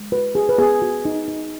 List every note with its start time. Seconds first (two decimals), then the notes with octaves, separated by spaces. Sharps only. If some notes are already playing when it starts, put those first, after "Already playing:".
Already playing: G#3
0.12 F#4 B4
0.35 F#4 G#4
0.49 B4
0.58 B3 G#4
0.82 F#4
1.05 D#4
1.28 D#4